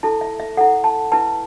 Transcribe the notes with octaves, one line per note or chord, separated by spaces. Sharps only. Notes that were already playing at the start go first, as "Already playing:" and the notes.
E4 A4 A5
E5
E5
E4 A4 F#5
A5
E4 B4 A5